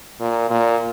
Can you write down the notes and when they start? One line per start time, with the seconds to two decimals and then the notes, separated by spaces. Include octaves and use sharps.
0.20 A#2
0.50 A#2